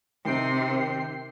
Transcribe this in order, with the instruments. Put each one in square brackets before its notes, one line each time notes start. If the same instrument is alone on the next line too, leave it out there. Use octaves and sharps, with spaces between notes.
[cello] C3 [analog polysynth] D#3 G5 C7